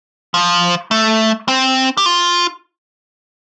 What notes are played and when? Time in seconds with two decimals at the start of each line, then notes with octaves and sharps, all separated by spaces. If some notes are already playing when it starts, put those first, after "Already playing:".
0.34 F3
0.91 A3
1.48 C4
1.97 G4
2.06 F4